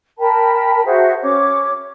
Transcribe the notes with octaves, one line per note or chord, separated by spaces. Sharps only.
A#4 G5 A5 B5
F#4 G#4 C5 E5
C#4 C#5 D6